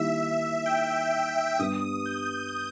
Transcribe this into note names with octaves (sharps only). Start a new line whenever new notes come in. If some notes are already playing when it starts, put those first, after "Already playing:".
Already playing: D#3 G3 A#3 E4 E5
G5
G2 G3 B3 D#6
G6